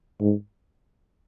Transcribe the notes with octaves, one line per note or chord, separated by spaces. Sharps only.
G#2